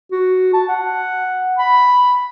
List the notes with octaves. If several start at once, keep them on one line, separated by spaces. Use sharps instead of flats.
F#4
A5
F#5
B5